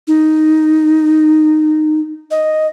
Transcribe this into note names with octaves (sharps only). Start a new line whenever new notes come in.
D#4
D#5